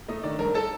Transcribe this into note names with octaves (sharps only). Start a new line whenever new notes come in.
A3 D#4 D#5
D#3 D4 D5
G2 A#4
A4 A5